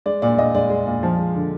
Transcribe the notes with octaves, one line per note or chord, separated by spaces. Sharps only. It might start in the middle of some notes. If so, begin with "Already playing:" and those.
G#3 D5
A#2 D5
A#2 D#5
G#3 D5
G#3
A#2
F3
G#3
D3